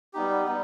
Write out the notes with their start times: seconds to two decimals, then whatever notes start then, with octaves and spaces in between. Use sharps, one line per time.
0.13 G3 B3 D#4 G4
0.46 G3 B3 D#4